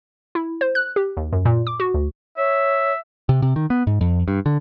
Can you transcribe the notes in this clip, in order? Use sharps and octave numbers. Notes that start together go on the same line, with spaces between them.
E4
C5
F#6
G4
D#2
F#2
A#2
D6
F#4
D2
C#5 E5
C3
C3
D#3
B3
G#2
F2
G2
D3